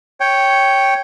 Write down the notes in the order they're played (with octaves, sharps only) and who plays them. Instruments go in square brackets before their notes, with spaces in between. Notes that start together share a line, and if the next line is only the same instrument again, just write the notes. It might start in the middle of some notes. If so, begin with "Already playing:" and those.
[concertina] C#5 G5